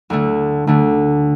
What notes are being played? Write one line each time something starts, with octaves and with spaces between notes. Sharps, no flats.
D2 D3 A3 D4
D2 D3 A3 D4